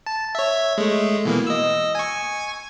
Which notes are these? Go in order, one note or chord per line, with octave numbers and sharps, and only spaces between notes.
A5
C#5 E5
G#3 A3
B2 E3 A#3
D#5 E6
G#5 C#6